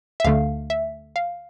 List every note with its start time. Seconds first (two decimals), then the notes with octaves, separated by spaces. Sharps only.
0.20 E5
0.24 D2 D3 A3 F5
0.70 E5
1.16 F5